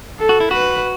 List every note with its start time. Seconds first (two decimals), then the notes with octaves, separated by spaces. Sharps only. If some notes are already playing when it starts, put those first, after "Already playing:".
0.19 A4
0.29 F#4
0.40 E4
0.51 F#4 B4